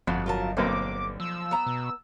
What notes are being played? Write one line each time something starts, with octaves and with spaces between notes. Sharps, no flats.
G1 F2 F#4
F#3 F4 A#4 A5
B1 D3 A#3 C4 D6
F3 E6
B3 A#5
B2